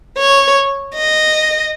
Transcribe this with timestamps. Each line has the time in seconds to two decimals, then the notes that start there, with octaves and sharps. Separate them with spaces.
0.18 C#5
0.94 D#5